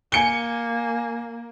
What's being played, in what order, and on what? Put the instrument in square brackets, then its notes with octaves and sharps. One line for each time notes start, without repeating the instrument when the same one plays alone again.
[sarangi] A#3 [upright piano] G#5 C#7 G7